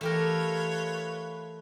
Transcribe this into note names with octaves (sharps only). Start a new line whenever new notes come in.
E3 A3 F4 G4 A#4 B4 C#5